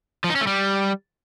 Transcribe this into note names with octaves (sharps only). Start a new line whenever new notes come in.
F3
D#4
C#4
A3
G3